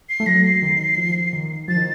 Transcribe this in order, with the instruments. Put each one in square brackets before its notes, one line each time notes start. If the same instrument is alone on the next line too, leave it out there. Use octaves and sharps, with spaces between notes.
[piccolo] C7
[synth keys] A3
[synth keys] F#3 [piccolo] A#6
[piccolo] C7
[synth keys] D#3
F3
D#3
[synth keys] F3 [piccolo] A6
[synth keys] D#3